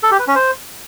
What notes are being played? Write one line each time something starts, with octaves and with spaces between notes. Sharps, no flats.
A4
G4
B4
C#4
C5